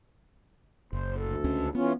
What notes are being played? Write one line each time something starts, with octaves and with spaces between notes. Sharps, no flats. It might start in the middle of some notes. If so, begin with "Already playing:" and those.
F#1 C5
D2 A4
C#2 C#4
E3 B3 C#4 F4